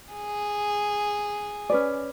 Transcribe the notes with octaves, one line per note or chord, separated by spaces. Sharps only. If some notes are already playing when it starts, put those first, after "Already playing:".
G#4
C#4 B4 D5